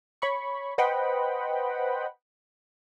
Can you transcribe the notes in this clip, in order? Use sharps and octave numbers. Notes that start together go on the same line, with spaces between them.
C#5 B5 C#6
B4 C5 D#5 F#5 G5 B5